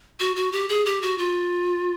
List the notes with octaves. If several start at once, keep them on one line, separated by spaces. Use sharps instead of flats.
F#4
F#4
G4
G#4
G4
F#4
F4